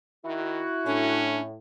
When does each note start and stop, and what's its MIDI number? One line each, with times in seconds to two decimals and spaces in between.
0.25 0.62 51
0.25 1.31 64
0.25 1.31 66
0.86 1.56 45
0.86 1.44 61
0.86 1.41 62